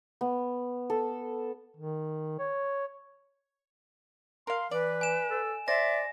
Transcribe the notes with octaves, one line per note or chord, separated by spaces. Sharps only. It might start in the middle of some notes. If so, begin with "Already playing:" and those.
B3
A4
D#3
C#5
A#4 F5 C6
E3 B4 D5
G#5 E7
A4
C5 D5 E5 A#6